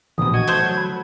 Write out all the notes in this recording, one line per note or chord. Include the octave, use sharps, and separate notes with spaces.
A#1 B2 D3 E3 F3 D#6
F#4 D#5 G#6
A3 C5
F#3
B5